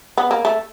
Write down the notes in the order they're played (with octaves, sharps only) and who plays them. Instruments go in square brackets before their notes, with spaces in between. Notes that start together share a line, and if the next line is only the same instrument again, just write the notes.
[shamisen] B3
A#3
A3